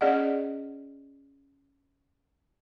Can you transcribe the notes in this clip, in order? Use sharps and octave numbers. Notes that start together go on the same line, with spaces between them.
C#4 G#4 D5 D#5 F#5